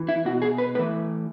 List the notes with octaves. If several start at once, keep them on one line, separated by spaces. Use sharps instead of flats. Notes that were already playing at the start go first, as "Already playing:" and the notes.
Already playing: E3
E4
B2 F#4
G#4
B4
A2 E3 B4